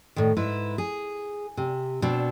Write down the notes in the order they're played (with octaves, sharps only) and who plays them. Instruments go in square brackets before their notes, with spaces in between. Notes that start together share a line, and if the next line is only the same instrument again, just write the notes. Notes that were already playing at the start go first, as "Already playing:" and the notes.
[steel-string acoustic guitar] A2 D#3
G#2 E4 B4
G#4
C3
B2 C4 D4